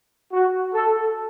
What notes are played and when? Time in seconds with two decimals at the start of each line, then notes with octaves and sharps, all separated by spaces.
0.32 F#4
0.73 A4